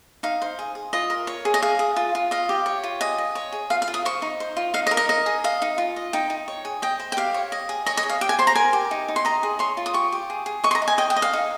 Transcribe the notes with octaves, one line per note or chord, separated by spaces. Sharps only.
D#4 F5
C5
G#4
G#4
F4 D#5
A#4
C#5
G#4
D#5
G#4 F5
G#4
F4
F4
D#5 F5
G4
C#5
F4
G#4 D#5
D#5
C#5
G#4
F4 F5
F5
F4
D#6
C5 C#6
D#4
C5
F4
D#4 F5
D#5
A#4
D#5
D#5
G#4
D#5 F5
D#4
F4
D#5
D#4 G5
D#4
C#5
G#4
D#5 G5
C5
G5
G4 F5
C#5
D#5
G#4
C#5 D#5
D#5
G#4
F5
G4 G5
G#5
C5 C6
A#5
A#4 G#5
G4
D#4
D#4
C6
D#5 A#5
G#4
C#5 C6
F4
D#6
G4 C#6
G4
G#4
G#4
D#5 C#6
C6
A#5
D#5
G#5
D#5 G5
G5
D#5
F5
D#4